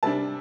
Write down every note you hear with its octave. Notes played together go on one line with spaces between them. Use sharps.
C3 G3 D4 A5